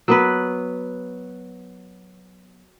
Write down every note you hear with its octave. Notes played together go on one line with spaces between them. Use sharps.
F#3 B3 B4